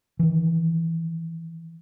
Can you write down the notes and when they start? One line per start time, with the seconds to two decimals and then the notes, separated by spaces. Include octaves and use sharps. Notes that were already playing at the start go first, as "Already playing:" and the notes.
0.19 D#3 E3